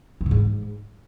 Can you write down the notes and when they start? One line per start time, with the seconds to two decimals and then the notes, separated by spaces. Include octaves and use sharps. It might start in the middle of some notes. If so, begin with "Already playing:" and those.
0.21 E3
0.26 B2
0.31 G#2